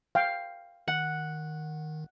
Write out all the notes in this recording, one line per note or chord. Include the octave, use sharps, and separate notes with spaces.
F5 G5
D#3 F#5